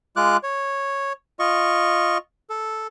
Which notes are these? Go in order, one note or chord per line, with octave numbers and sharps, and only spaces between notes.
G#3 F4 D6 F#6
C#5
F4 D#5 C#6
A4